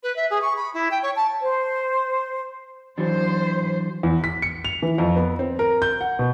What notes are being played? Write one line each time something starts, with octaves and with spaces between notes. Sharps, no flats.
B4
E5
G#4
C#6
B5
E4
G5
C#5
A5
C5
E3 F#3 D4 C5
E2
B6
C#7
F7
E3
F2
B3
C4
A#4
G6
F#5
B2